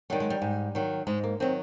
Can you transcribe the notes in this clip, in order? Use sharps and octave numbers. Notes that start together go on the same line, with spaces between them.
D#3 F#3 G3
G#3
G3
G#2
D#3 F#3
G#2 G#3
A#3
D#3 F#3 C4